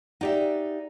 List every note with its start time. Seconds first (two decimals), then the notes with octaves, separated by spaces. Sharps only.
0.21 D#4 G4 D5 E5 F#5